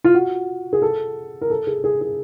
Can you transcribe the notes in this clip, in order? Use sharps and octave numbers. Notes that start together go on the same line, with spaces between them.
F4
F#4
G#4
A4
A#4
A4
G#4
G#4
G#4